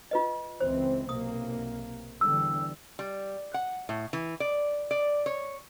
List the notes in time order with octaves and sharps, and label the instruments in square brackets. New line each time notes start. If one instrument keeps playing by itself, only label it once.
[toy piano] F4 B4 D#5
[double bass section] C#2 E3 C4 [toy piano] C5
[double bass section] B1 C3 A#3 [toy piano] D#6
[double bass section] E2 D3 G3 [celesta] E6
[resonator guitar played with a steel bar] G3
F#5
A2
E3
D5
D5
C#5